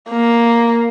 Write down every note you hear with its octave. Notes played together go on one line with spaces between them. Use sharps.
A#3